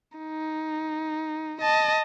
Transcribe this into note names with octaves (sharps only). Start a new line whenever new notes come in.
D#4
D#5 A5